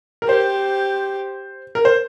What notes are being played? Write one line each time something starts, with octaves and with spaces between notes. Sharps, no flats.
A#4
G4 C5
A#4
C5